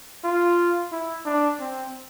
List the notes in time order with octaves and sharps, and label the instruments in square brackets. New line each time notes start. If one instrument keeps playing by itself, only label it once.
[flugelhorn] F4
E4
D4
C4